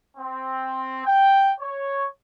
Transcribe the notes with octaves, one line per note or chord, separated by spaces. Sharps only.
C4
G5
C#5